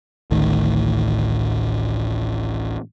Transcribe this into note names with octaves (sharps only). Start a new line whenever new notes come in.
A1 D2 A2 D#3